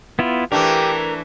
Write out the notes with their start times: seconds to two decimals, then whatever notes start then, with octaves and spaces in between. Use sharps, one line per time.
0.19 B3 E4 F4
0.52 E3 A3 D4 G4 A#4